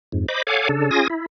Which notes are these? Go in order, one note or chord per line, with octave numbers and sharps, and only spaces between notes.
F2 G#2
C5 D#5 B5 D6
A4 C#5 F5 F#5 G#5 D6
C#3 D4 A4
C#4 F4 G#4 G#5 D#6 A#6
E4